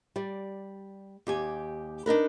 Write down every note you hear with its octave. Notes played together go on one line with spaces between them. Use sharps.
G3 D5
D#2 G4 G#5
D4 D#4 A#4 B4